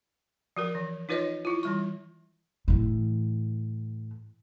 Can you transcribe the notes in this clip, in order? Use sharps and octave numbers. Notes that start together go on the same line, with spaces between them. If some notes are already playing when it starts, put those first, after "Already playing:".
F3 F#4 A#4
E3
D#4 F4 B4 C#5 D#5
E4 F4
E3 G3 C#6
A2 E3